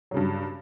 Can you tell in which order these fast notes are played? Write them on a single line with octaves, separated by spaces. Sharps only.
F#3 C#3 G2